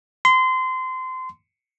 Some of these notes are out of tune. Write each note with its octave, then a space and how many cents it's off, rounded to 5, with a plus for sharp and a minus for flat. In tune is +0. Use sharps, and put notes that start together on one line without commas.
C6 -25